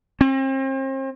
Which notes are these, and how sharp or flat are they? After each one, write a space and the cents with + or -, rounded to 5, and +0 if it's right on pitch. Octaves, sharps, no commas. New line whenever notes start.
C4 +40